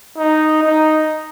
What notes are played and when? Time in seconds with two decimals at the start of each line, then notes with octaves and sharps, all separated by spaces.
0.17 D#4
0.63 D#4